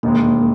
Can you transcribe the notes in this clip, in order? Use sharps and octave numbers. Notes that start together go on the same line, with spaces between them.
E1 D#2 D#3 G#3 A#3